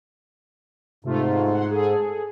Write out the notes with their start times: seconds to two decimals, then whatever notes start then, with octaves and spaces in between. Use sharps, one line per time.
1.04 G#2 C3 A3 F4
1.53 F#5 C6
1.71 G#4 A4